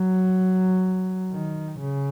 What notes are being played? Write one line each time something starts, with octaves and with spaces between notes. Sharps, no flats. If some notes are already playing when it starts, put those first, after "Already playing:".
Already playing: F#3
D#3
C#3